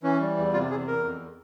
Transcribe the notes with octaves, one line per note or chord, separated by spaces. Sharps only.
E3 C#4
G3
E2
C3 F4
E2 G#4
E2 A#4
F2